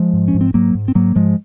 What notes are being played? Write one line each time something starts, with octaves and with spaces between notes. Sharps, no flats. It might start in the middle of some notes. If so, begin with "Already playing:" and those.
Already playing: F3 G#3
G#2
C#4
G#2
C4
G#2 F#3 A#3
G#2
C4
G#2 F#3 A#3
G#2 F3 G#3